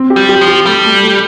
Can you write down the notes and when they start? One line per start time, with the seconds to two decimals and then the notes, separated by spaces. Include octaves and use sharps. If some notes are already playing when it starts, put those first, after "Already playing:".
Already playing: C4
0.10 G4
0.16 G3
0.29 G4
0.41 F3
0.48 G4
0.66 G3 A3
0.85 A3
1.03 A3